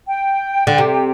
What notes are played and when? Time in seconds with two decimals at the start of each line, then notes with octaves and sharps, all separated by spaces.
0.08 G5
0.67 D3
0.78 C3